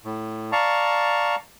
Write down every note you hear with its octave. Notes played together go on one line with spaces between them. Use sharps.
A2
D5 F5 A5 A#5 C#6